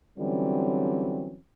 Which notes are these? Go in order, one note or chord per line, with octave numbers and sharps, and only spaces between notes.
D3 E3 F#3 G3 C4 C#4